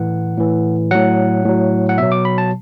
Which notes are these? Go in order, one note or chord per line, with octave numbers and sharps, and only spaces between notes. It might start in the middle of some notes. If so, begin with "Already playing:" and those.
Already playing: A2 E3 F#5
A2 E3
A2 F#3 F#5
A2 F#3
F#5
B2 F#3 E5
D6
B5
A5